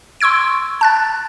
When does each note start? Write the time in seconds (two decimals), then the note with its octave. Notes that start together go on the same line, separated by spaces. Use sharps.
0.21 C6 C#6 E6 G#6 D7
0.81 A5 F#6 A6